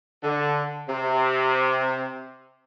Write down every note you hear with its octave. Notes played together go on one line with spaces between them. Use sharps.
D3
C3